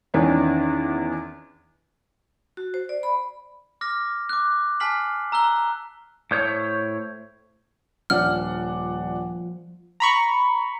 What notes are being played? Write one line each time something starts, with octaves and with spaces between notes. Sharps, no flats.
E2 D#3 C#4 D4
F#4
C5
D5
B5
D6 F6 A#6
D6 F#6
G#5 A5 F6 B6 C7 F#7
A#5 E6 F#6 G7
A2 C5 C#5
D#1 F3 D4 F#5 F6
A#5 B5 C#6